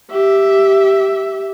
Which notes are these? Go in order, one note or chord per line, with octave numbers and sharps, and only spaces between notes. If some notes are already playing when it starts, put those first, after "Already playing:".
G4 E5